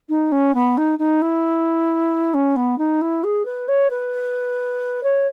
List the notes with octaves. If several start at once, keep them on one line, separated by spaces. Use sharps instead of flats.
D#4
C#4
B3
D#4
D#4
E4
C#4
B3
D#4
E4
G#4
B4
C#5
B4
C#5